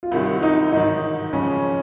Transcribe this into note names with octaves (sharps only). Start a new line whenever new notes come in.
F4
C2 C3 D#3 F#3 E4
D#4
A1 G#2 D#3 F#3 D#4
F#1 F2 C#3 F3 G#3 C#4